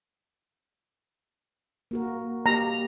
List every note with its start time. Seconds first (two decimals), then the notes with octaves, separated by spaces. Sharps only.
1.91 A#3 F#4 A#4
2.46 A#3 G4 A#5